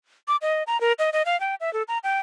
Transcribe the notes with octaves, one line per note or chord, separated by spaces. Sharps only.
D6
D#5
A#5
A#4
D#5
D#5
F5
G5
E5
A4
A#5
G5